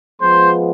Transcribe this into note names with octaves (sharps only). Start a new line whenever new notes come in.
F3 G#3 B3 C5 C6